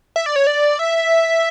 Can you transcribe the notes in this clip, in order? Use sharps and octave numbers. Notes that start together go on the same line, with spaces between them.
E5
D5
C#5
D5
E5